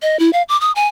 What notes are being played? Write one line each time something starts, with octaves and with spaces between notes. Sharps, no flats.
D#5
E4
F5
D6
D#6
G#5